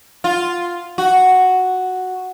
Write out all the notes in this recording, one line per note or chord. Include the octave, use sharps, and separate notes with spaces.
F4
F#4